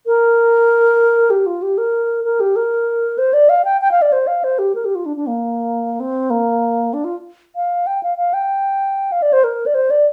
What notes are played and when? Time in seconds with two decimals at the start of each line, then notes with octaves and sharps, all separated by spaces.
0.06 A#4
1.30 G4
1.46 F4
1.62 G4
1.78 A#4
2.24 A#4
2.40 G4
2.56 A#4
3.18 C5
3.33 D5
3.49 F5
3.65 G5
3.81 G5
3.91 F5
4.02 D5
4.12 C5
4.27 F5
4.44 C5
4.59 G4
4.75 A#4
4.85 G4
4.95 F4
5.06 D4
5.16 D4
5.27 A#3
6.00 C4
6.30 A#3
6.93 D4
7.04 F4
7.56 F5
7.87 G5
8.03 F5
8.18 F5
8.33 G5
9.12 F5
9.22 D5
9.33 C5
9.44 A#4
9.66 D5
9.74 C5
9.90 D5